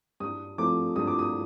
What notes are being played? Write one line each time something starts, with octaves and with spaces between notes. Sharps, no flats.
G2 D#6
F3 A3 C4 D6
G2 D#6
D6
D#6